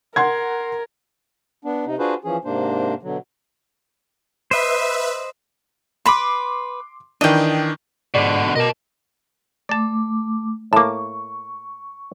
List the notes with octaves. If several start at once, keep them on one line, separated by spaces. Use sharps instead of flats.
A#4 F#5 C6 G#6
B3 D4
C3 D#4
D4 F4 F#4 G#4 B4 C5
E3 F3 C#4 G#4
G#2 C3 A#3 D4 C5
B2 D3 F#3
B4 C5 D#5 E5
B4 B5 C6 D6
D#3 E3 D4 D#5 G5
G#2 B2 D3 D5
B2 A#4 D#5 A5 D6
A3 D5 A5 D6
A2 A#3 A5 C#6 D6